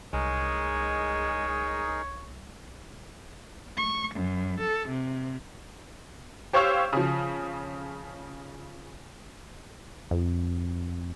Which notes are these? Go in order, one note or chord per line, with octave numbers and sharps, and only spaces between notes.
C2 G#3 D#4 G#4 A#4 C#5
C#6
F#2
A4
C3
G4 C5 C#5 F5 C#6 E6
C#3 F3
F2